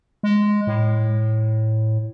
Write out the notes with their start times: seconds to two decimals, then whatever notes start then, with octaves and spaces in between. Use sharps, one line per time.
0.23 G#3
0.67 A2